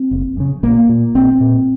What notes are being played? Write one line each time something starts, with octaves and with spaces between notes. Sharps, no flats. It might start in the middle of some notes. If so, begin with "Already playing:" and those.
Already playing: C4
F#1
F#2 C#3
A#1 A#3
A#2
A#1 C4
A#2